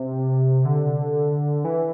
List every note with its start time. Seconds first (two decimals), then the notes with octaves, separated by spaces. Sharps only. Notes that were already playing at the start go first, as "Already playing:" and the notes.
Already playing: C3
0.65 D3
1.65 E3